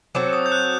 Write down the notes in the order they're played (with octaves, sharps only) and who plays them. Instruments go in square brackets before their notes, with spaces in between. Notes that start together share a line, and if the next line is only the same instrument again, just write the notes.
[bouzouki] F#3 C4 F#4 A4 [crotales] D6
[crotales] D#6
G6
F#6